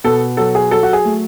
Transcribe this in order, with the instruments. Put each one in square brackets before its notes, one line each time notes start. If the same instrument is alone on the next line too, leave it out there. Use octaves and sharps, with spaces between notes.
[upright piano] B2 A4
F#3 A4
G#4
F#3 A4
F#4
G#4
A3